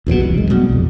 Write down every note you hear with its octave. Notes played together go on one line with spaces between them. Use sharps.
A#1 E2 G#2 B2
F1 C2
F#2 G#3
B2 G3 B3
C2 F2